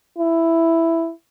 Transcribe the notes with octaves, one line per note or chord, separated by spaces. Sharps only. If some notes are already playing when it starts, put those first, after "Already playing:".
E4